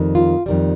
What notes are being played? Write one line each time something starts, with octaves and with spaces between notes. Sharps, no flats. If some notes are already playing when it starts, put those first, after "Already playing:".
Already playing: F2 D#3 G3
F4
F2 D#3 G3